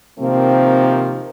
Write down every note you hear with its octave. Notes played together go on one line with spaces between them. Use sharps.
C3 D#3 F3 A#3 C4